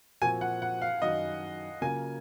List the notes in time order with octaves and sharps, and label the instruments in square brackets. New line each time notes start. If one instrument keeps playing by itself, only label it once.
[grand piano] A#2 F3 C4 F#4 A#4 [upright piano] G#5
[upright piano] F#5
F#5
F5
[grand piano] F#2 D#3 F#3 [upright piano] D#5
[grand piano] C#3 F#3 A#3 F4 [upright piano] G#5